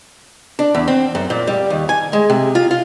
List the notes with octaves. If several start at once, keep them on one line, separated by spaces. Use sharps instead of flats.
D4
E2
C4
F#2
A#2
G3
D#2
G#5
G#3
C3
F4
F4